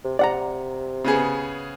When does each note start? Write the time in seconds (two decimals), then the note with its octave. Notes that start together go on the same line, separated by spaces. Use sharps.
0.04 C3
0.19 C3 D5 F#5 A#5
1.04 C#3 B3 G#4